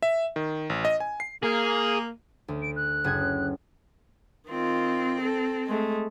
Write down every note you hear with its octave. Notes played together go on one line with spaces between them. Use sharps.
E5
D#3
A1
D#5
G#5
C7
A#3 G#4
D2
D7
F#6
F#1 G#4 G#6
D#3 C4 F4
A4
G#3 A3